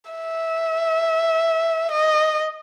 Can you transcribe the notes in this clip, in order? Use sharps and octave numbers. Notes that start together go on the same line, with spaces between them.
E5
D#5